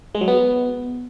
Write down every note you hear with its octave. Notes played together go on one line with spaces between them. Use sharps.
G#3
F#3
B3